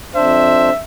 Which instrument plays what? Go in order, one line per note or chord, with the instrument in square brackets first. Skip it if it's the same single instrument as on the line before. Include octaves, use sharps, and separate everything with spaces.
[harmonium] F2 D4 C5 [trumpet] E5